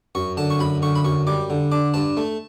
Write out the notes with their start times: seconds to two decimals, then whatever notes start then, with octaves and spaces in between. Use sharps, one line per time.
0.15 F#2 C#6
0.37 D3 A5
0.50 C#6
0.59 F#2 B5
0.82 D3 C#6
0.95 B5
1.05 F#2 C#6
1.27 G3 D6
1.50 D3
1.72 D4 D6
1.94 G2 A5
2.17 A3